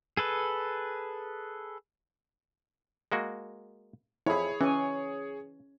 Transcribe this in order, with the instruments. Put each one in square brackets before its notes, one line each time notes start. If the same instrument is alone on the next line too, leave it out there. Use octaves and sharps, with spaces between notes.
[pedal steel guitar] G#4 A4 B4
[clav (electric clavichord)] G#3 A#3 F#4
[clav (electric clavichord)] F2 [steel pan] E4 [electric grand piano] G#4 C#5
[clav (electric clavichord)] E3 [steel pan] C#4 G#5